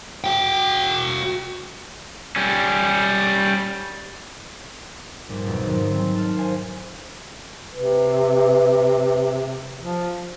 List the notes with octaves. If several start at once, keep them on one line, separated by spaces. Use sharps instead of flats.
F#4 G5
G3 C#4
A#1 G#2 G3
B1 F2 B2
F2 G#2 D#3 F#3
D#3 C4
A5 F6
C5 F5 G#5
C3 B4
F3